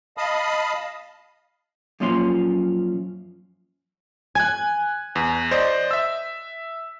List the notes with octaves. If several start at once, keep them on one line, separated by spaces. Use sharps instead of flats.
D#5 F5 A5 B5 D#6
F#2 A#2 F3 C#4 C6
G#5 F#6 G#6
E2
C5 D5 D#5
E5 E6